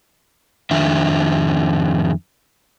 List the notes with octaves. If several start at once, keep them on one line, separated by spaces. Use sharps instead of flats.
F2 D#3 D4 E5